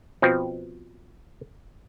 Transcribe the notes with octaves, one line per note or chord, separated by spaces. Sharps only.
B2 F3 C4